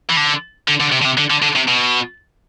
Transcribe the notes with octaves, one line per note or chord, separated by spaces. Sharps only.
E3
D3
D3
D3
C3
D3
C3
D3
D3
D3
C3
B2